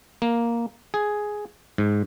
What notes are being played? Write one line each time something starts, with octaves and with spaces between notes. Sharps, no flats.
A#3
G#4
G#2